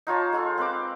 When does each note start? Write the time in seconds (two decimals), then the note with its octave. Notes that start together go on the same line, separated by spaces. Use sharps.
0.07 D#4 F4 C#5 A5
0.33 G#3 F4 A4
0.58 C4 B4 A#5 D6